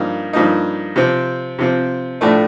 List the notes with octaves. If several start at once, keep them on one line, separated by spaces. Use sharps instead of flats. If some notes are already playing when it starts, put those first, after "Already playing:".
Already playing: G2 F3 A#3 D#4
G2 F3 A#3 D#4
C3 F3 C4
C3 F3 C4
A2 F3 A3 D4